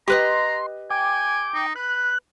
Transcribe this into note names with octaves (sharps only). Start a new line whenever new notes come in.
G4 B4 D#5 A#5 C6
G5 G#5 D6
D#4
B4 F#6